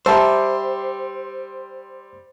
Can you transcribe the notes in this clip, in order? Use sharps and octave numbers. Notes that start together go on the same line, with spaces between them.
G3 G4 C5 E5 A5 A#5 C6 E6